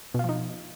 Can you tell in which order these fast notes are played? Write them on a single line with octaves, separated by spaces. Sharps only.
B2 F4 F3 D#4